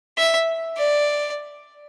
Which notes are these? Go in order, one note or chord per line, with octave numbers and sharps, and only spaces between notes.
E5
D5